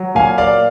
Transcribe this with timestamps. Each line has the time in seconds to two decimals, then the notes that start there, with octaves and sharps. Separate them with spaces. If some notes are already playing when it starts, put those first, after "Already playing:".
Already playing: F#3
0.15 A#2 F5 G#5
0.38 A#3 D5 F5